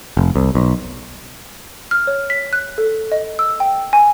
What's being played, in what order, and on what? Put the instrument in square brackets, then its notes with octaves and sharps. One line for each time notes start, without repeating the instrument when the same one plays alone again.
[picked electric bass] F1
C2
B1
[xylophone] F6
C#5
B6
F#6
A4
D#5
E6
G5
G#5